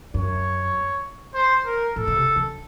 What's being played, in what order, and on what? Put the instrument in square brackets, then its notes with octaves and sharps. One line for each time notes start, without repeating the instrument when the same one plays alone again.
[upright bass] F#2 [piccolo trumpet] C#5
[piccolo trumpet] C5
A#4
[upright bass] A2 [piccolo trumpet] A4
[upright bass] C#3
C3
D#3